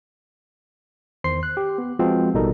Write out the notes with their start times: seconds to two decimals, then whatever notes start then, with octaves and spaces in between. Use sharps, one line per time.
1.24 E2 D#3 C5 C6 C7
1.43 F#6
1.57 G4
1.78 B3
1.99 F3 G#3 C4 F4 F#4 B4
2.34 A1 B2 G3 D#4 A4 A#4